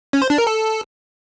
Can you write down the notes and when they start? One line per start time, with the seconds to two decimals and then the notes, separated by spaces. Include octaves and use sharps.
0.13 C#4
0.22 C5
0.30 D4
0.38 A#4
0.47 A4